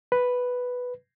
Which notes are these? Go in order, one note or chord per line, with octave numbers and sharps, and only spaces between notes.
B4